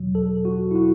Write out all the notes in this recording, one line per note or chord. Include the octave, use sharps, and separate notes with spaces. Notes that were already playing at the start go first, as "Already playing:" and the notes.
Already playing: E2 B2 F#3
A4
F#4
E4
F#4